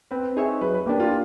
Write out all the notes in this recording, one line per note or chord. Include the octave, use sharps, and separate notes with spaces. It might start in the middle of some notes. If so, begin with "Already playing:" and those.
C4 B4
D#4 G#4 C#5 E5
F#3 B4
B4
A#3 D4 G4
F4